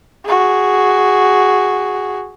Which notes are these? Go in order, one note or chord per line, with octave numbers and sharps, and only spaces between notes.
F#4 G#4